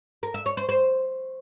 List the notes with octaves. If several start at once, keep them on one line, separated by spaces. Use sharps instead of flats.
A#4
E5
C#5
C5
C5